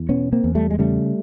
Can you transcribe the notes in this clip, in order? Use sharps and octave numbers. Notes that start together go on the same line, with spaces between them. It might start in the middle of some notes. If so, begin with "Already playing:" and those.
Already playing: E2
B2 B3 C#4
A#3 C4
E2
G3 A3
G#3
C#3 G3 A3